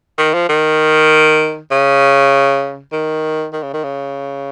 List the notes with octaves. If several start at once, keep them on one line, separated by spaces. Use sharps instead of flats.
D#3
F3
D#3
C#3
D#3
D#3
C#3
D#3
C#3